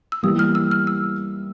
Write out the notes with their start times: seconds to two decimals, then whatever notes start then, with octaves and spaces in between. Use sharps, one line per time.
0.12 E6
0.23 E3 G3 A#3 D#6
0.39 F6
0.55 E6
0.71 F6
0.87 E6